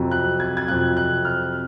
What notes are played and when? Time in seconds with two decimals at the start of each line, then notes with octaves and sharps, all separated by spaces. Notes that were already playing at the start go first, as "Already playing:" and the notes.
Already playing: F2 C3 F#3
0.11 F#6
0.40 G#6
0.57 G#6
0.68 F2 C3 F#3 F#6
0.97 F#6
1.25 F6